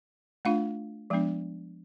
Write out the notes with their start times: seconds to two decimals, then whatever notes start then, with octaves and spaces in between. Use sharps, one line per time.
0.45 A3 D4 F4 F5
1.10 F3 G#3 B3 D4